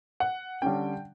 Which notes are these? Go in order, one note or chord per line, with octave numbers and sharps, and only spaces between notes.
F#5
D3 G3 C#4 G5